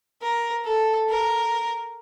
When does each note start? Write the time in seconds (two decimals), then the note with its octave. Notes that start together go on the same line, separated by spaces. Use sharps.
0.22 A#4
0.65 A4
1.09 A#4